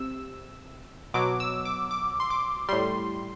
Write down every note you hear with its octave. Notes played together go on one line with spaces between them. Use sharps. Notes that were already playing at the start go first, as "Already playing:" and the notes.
Already playing: C3 E6
B2 F#3 D6
E6
D6
D6
C6
D6
A2 G3 C6